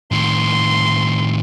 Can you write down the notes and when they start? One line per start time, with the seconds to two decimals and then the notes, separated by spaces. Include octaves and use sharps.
0.12 A2 D#3 C6